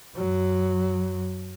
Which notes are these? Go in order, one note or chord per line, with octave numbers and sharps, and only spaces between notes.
F#2 F#3